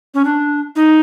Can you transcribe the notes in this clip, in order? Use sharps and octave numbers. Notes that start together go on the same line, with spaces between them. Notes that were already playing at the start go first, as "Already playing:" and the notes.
C#4
D4
D#4